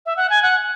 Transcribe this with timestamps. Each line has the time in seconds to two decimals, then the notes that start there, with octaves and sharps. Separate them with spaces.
0.06 E5
0.17 F#5
0.30 G#5
0.42 F#5